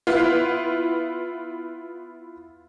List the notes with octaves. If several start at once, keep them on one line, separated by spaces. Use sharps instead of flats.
B3 E4 F4